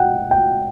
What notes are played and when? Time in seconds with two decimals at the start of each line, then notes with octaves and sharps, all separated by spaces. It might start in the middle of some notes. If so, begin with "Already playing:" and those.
Already playing: F#5 G5
0.31 G5